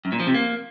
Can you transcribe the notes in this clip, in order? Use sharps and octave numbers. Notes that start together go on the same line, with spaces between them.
F#2
A#2
F3
C3
A#3